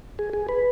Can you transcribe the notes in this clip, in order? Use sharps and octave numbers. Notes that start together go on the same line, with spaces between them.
G#4
G#4
B4